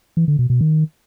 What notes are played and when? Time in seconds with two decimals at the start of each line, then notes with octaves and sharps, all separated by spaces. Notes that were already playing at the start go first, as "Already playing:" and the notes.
0.17 E3
0.28 D3
0.39 B2
0.50 B2
0.61 D#3